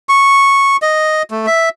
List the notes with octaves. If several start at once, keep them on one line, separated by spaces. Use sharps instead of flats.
C#6
D#5
A3
E5